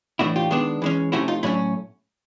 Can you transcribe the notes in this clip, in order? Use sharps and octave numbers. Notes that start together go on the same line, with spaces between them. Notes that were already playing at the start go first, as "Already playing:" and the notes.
A2 E3 A3 D4 E4 F#4
F4 G4
D#3 G#3 B3 D4
E3 G#3 C#4
C3 F3 A3 C#4 E4 F#4
D#4 F4
A2 F#3 A3 C#4 D4 E4